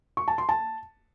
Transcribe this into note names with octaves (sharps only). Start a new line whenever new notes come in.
C#6
A5
C6
A5